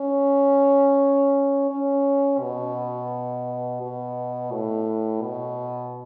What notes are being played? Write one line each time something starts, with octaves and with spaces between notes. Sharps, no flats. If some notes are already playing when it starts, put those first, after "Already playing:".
Already playing: C#4
C#4
B2
B2
A2
B2